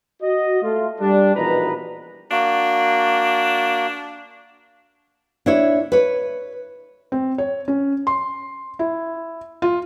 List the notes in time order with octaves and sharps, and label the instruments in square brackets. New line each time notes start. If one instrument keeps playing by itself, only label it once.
[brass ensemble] F#4 D#5
A3 F4
G3 D4
A#1 B2 E3 D#4 B4 A#5
[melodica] A#3 F#4 [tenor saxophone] D4
[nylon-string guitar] D4 E4 C#5
B4 C#5
[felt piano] C4
C#5
C#4
C6
E4
F4